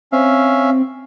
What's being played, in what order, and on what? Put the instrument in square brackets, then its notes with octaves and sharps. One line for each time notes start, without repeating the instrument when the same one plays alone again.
[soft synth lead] C4 [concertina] C#4 E5 F5